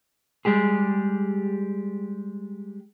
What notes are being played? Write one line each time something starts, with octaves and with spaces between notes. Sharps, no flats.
G3 G#3 G4 G#4